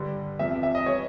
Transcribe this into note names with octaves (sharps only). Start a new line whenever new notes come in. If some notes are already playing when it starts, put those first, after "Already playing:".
Already playing: G2 D3 G3
E2 C3 F3 E5
E5
D#5
E3 G3 C#5